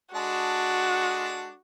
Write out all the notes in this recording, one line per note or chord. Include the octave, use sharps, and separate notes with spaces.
G#3 D4 F#4 A4